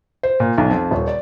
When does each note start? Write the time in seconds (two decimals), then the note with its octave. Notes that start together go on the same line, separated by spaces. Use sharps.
0.23 C5
0.40 A#2
0.58 B1
0.70 F2
0.91 D#1
1.08 D5